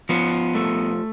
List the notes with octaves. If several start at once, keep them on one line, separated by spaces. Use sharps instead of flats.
F3 B3
A3